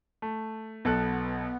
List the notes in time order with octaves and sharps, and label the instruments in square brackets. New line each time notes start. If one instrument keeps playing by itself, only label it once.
[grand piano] A3
[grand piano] B1 A4 F#6 [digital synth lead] B3